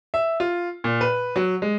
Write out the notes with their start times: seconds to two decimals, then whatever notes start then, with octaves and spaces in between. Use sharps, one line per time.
0.14 E5
0.40 F4
0.84 A#2
1.01 B4
1.36 F#3
1.62 G#3